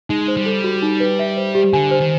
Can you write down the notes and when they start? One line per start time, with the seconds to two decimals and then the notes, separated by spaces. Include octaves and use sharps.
0.09 G#3 D#4
0.28 C5
0.37 G3
0.46 A4
0.64 F#4
0.82 D#4
1.00 B4
1.19 E5
1.37 C5
1.55 G4
1.73 D3 G#5
1.91 C5
2.01 D#3